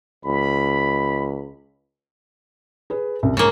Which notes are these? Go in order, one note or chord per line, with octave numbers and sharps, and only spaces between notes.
C#2 B5
G#4 B4
C2 F#2
G#2 C#3 A#3